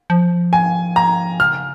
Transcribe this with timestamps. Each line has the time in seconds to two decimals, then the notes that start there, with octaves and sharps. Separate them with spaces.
0.10 F3
0.53 G#5
0.96 A#5
1.40 C#3 F6